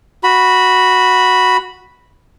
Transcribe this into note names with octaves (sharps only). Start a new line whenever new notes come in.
F#4 B5